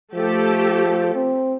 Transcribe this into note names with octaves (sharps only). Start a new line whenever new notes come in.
F3 A3 G4 A4
C4